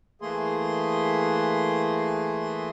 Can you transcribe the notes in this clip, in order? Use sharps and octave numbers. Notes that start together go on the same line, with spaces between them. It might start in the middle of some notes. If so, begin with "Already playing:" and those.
E3 A3 A#3 G#4 C6